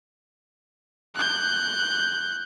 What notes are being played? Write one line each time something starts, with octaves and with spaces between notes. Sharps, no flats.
F#6 G6